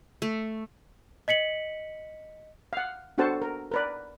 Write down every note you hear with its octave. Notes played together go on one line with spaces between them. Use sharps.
A3
D#5 B6 C#7 F#7
F5 F#5
B3 D4 F#4 A4 C5 A5
A#4
A#4 B4 D5